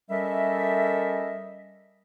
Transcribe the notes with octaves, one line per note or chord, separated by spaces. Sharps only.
G3 C#4 A4 A#4 D#5 E5